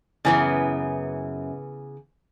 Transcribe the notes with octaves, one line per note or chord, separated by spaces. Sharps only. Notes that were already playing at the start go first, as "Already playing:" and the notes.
F#2 C#3 E3 B3 E4 G#5